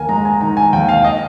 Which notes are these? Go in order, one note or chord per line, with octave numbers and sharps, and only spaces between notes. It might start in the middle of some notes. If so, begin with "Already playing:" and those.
Already playing: D#2 A#4 G#5
G#3 A#5
G#5
D#3 A#5
G#5
D#2 G5
F5
D#5